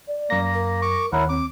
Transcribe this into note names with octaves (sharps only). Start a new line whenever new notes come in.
D5
F#2 A#3 A#6
A#4
C#6 D6
D#2 E4 A#4 C#5 F#5
C4 D6